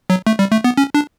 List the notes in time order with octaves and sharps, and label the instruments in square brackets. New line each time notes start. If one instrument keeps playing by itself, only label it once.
[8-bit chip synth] F#3
A3
G3
A3
B3
C#4
D4